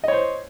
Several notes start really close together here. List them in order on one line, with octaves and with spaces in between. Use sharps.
D#5 C#5 C5